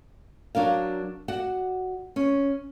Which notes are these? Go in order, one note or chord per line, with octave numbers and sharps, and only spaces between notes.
F#3 D4 A#4 F5
F#4 D5 F#5
C#4